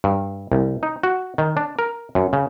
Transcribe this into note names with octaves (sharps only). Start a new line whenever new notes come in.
G2
C2
D#4
F#4
D#3
D4
A#4
F#2
C#3